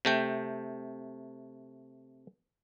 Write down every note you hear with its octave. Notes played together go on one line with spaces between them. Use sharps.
C3 A3 G5